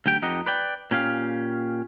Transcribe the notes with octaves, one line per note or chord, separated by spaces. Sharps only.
D2 F#3 G4 G5
F2 D#4 G4 D#5 F#5
B4 D5 G5
A#2 C#4 G4 F5